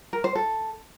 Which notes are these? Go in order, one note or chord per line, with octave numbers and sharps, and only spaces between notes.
A#4
C5
A4